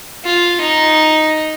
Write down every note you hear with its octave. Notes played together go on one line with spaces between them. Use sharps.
F4
D#4